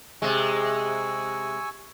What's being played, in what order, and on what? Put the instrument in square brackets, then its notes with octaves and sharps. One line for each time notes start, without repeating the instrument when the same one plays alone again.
[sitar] C3 G#3 [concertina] G#5 C#6 E6